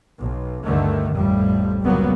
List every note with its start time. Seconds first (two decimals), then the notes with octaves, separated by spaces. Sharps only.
0.18 B1
0.65 D2 G2 D3 D#3 A3
1.11 A1 F2 A2 G3
1.81 F1 C#2 F#3 G3 A#3 B3